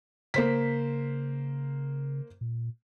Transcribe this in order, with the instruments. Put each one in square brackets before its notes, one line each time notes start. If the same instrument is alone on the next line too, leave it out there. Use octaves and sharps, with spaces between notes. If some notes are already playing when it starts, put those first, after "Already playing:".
[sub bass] C#3 [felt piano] A#3 C5 B6
[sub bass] A#2